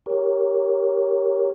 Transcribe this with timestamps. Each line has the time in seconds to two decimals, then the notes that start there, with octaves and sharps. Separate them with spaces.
0.06 G4 A#4 C#5